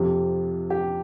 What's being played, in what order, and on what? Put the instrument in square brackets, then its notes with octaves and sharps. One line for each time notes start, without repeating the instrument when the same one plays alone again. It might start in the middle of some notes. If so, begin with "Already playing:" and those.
Already playing: [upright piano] F2 C3 F3 G4
G4